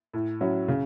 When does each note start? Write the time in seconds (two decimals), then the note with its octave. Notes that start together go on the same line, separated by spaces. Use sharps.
0.13 A2
0.41 F#3 C#4 E4
0.68 C#3